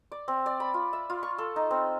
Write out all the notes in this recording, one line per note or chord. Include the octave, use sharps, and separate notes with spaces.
D5
C4
D5
B5
F4
E5
F4
C#6
A4
D#4
C4